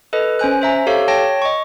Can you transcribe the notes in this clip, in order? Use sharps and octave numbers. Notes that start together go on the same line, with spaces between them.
A4 B4 D#5
C#4 C5 G#5 F#6
C5 E5 A#5
G4 A4 C#5 F5
C#5 G5 A5 A#6
D#5 C#6